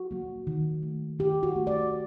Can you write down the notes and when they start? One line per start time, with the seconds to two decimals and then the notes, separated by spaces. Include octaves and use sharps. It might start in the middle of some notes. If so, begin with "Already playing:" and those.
Already playing: F#4
0.11 F#3 A#3
0.47 D#3
0.83 A3
1.19 D#3 G4
1.43 F#4
1.56 A3
1.67 D5